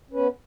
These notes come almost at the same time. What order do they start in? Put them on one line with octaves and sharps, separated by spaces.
C#4 B4 B3